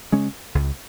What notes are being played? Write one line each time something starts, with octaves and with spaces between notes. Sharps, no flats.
C#3 G#3 C#4
C#2